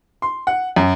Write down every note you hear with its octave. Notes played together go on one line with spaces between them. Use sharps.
C6
F#5
F#2